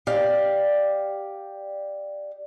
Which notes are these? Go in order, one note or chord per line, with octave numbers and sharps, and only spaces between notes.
G4 D5 F5